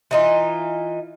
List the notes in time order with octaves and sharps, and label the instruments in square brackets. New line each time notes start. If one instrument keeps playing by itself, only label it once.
[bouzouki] E3 D#4 F4